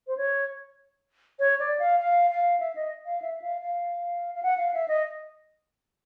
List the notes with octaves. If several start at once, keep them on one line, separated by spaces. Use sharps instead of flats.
C5
C#5
C#5
D5
F5
F5
F5
E5
D#5
F5
E5
F5
F5
F5
F#5
F5
E5
D#5